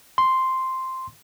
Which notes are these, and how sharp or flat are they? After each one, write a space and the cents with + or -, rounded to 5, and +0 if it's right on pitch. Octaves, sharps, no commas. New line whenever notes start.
C6 +0